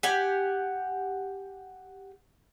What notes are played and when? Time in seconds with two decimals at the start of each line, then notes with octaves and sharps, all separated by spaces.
0.03 G4 F#5 G#5